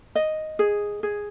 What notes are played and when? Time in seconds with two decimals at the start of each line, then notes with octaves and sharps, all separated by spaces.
0.15 D#5
0.59 G#4
1.03 G#4